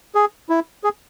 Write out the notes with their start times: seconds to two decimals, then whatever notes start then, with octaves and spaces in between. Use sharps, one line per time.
0.15 G#4
0.49 E4
0.84 G#4